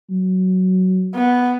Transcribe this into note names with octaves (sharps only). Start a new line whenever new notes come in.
F#3
B3